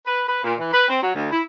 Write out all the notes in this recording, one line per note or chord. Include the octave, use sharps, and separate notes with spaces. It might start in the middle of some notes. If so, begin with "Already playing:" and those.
B4
B4
A#2
E3
B4
C4
F#3
D2
E4